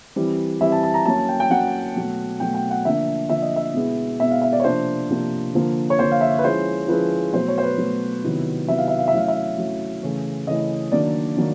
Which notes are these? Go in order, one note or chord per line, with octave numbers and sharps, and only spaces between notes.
E3 G3 C4 E4
E3 G3 C4 E4 E5
A5
A5
A#5
F#3 A#3 C#4 A5
G5
G5
F#3 A#3 C#4 F#5
B2 F#3 A3
B2 F#3 A3 G5
G5
F#5
D3 F3 A#3 D4 E5
D3 F3 A#3 D4 E5
D#5
E5
B2 G#3 B3 E4
B2 G#3 B3 E4 E5
F5
E5
D5
C#5
C3 F3 A#3 D4 C5
C3 F3 A#3 D4
D3 F3 A#3
C#5
D3 F3 A#3 C5
F5
E5
B4
F3 G#3 C#4 E4 C5
F3 G#3 C#4 E4 B4
B2 F#3 A3 C5
C#5
C5
B4
B2 F#3 A3
C3 D#3 F#3 B3 E4
C3 D#3 F#3 B3 E4 E5
F5
E5
F5
E5
F#3 A3 C#4 E4 F5
E5
F#3 A3 C#4 E4
C#3 E3 A3 C#4 E4
C#3 E3 A3 C#4 E4 D#5
D#3 F#3 A#3 D4 D5
D#3 F#3 A#3